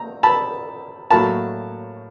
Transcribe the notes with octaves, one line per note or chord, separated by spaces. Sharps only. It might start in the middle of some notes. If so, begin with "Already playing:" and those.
Already playing: A#5
A5 B5
A2 F#3 A#3 A5 B5